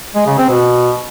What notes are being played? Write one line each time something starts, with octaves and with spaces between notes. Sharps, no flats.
G#3
C#3
C4
B2